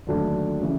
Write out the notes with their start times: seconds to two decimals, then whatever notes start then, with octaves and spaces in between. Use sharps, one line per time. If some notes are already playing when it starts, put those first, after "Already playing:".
0.07 D#2 D3 F#3 A3 D4
0.62 C#3 E3